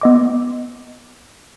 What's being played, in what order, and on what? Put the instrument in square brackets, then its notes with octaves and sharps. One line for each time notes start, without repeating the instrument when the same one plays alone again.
[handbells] B3 D#5 D6